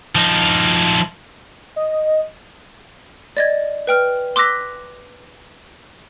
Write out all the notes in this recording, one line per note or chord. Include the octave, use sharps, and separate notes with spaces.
F3 D#4
D#5
D5 D#5 G#6
B4 G5 F6
C6 D6 E6 F#6 A#6 B6